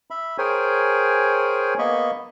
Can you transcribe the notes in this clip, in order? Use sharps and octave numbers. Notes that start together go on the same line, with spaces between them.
E5 B5
G#4 A#4 C5 C#5 G5 G#5
A#3 B3 D#5 B5 C#6